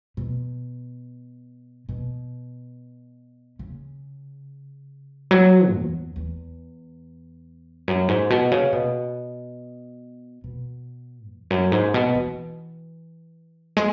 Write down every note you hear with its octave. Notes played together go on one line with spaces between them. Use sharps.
B2
B2
C#3
F#3
E2
E2
F#2
G#2
B2
C#3
B2
B2
E2
F#2
G#2
B2
E3
G#3